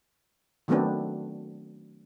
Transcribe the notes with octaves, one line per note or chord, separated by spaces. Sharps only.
D#3 F#3 A3 B3 C4 D4